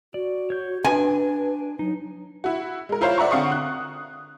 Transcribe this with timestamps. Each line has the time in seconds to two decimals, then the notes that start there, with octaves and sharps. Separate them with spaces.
0.14 F#4 D5
0.50 C#5 G6
0.84 D4 B4 G#5
1.79 F#3 D#4
2.44 E4 F#4
2.89 G#3 A#4
3.01 E4 F4 A#4 C5 C#5 F5
3.18 D5 E5 F#5 A#5 C#6
3.31 D3 C4 F5 F#5 C#6 D#6
3.52 F#6